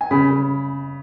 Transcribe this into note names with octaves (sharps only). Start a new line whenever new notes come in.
G#5
C#3 B5
C#3